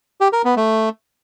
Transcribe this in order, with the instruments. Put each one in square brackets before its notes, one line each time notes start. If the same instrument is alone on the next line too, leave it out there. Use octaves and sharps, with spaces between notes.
[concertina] G4
A#4
B3
A3